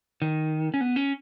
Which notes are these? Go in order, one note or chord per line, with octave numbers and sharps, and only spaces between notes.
D#3
C#4
B3
C#4